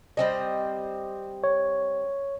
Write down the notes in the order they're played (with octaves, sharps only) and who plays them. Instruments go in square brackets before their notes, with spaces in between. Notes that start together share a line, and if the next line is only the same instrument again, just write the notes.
[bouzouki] G3 C4 D#5
[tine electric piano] C#5